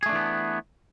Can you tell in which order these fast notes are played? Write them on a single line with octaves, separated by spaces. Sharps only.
G#4 A3 D4 E3 B3